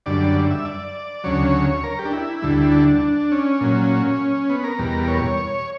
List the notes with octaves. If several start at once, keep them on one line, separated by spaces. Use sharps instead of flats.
F#2 D3 G3 D5
E5
D5
D2 C#3 F#3 C#5
A#4
G4
D4
E4
D2 D3 G3
D4
C#4
A#2 F#3
B3
A#4
E2 B2 G3
C#5